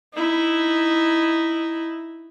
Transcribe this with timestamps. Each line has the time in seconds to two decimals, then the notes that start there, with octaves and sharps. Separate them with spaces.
0.14 D#4 E4